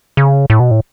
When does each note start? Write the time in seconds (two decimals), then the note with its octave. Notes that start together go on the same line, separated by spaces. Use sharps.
0.17 C#3
0.50 A2
0.60 B2
0.71 A2